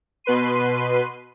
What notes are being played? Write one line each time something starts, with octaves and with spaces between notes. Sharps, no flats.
B2 B4 C6 D#7